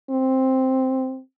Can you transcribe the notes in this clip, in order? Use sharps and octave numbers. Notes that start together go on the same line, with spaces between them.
C4